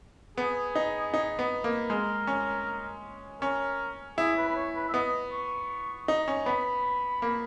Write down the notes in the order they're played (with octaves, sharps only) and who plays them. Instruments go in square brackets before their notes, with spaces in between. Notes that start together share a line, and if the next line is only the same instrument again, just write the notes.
[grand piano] B3 [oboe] G#4
[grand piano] D#4
D#4
B3
A#3
[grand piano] G#3 [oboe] A#4
[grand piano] C#4
[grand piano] C#4 [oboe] A#4
[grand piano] E4 [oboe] G#4
[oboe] B4
B4
C#5
B4
E5
[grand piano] B3 [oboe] D#5
[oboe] C#6
[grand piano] D#4
C#4
[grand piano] B3 [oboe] B5
[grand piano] A#3